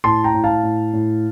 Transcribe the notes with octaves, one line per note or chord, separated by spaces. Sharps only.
A2 A5 C6
G5 A#5
A2
F5 A5
A2
A2